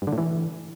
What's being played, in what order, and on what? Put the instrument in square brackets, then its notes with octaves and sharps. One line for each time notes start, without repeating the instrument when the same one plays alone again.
[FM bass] G2
D3
A2
E3